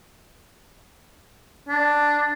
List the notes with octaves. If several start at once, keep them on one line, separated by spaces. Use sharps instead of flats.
D4